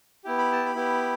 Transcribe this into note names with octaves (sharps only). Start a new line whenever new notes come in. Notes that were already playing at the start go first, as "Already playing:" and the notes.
B3 E4 G4
B5
A5
B5
B3 E4 G4